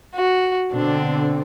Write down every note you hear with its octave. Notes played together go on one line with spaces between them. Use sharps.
F#4
B2 D3 C4 D4